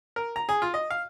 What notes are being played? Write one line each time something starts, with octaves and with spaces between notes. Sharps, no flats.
A#4
A#5
G#4
F4
D#5
F5